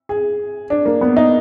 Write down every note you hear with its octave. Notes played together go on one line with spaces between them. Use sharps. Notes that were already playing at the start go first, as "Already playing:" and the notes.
G#4
D4
A#3
B3
D#4